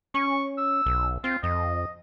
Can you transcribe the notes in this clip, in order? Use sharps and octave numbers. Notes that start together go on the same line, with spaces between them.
C#4 C#6
E6
B1
C4 F4
F2 D#5